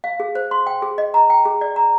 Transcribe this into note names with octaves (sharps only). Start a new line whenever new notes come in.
F5
G#4
C5
C6
G5
G#4
D#5
A#5
G5
G#4
D5
A#5